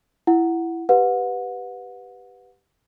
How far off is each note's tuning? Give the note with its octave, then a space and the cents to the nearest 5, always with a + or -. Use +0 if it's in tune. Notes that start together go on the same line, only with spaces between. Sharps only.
E4 +15 F#5 +0
G4 +0 B4 +5 F#5 -30